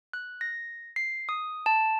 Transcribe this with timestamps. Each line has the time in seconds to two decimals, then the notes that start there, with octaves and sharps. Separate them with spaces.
0.13 F#6
0.41 A#6
0.96 C7
1.29 D#6
1.66 A5